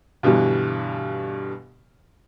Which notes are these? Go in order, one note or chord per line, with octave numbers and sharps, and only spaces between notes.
G2 B2 D3 E3 G3